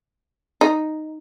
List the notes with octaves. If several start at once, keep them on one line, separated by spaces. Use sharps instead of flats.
D#4